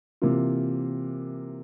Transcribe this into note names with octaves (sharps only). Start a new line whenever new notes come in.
C3 E3 A#3 F4